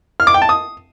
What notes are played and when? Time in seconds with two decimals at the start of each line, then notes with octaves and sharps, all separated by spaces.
0.20 F6
0.27 D6
0.34 G5
0.42 A5
0.49 D#6